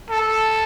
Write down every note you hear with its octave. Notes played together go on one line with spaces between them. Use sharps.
A4